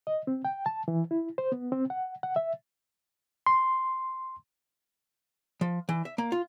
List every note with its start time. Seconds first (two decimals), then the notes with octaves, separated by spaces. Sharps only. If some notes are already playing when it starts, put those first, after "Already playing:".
0.07 D#5
0.27 C4
0.45 G5
0.66 A5
0.88 E3
1.11 E4
1.38 C5
1.52 B3
1.72 C4
1.90 F#5
2.23 F#5
2.36 E5
3.46 C6
5.61 F3
5.89 E3
6.05 E5
6.18 A#3
6.32 F4